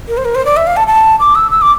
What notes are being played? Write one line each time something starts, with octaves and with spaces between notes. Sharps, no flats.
A#4
C5
A#4
C5
D5
E5
F5
A5
A5
D6
E6
E6
D6